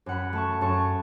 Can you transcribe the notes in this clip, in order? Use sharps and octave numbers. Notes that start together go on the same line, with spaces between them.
F#2 F#5 B5
A3 A5 C#6
F#2 A5 C#6